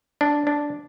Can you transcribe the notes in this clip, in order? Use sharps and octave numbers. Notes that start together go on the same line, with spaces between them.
D4
D4